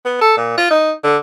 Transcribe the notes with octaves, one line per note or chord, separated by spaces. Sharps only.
B3
A4
A#2
F4
D#4
D3